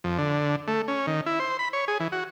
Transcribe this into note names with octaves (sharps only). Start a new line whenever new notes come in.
F2
D3
A3
C#4
D#3
E4
C5
B5
C#5
G#4
E3
F#4